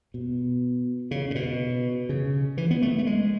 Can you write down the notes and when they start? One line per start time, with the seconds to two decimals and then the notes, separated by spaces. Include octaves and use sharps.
0.14 B2
1.11 C#3
1.31 A2
1.35 B2
2.09 C#3
2.57 E3
2.71 B3
2.82 A3
2.98 A3
3.07 G#3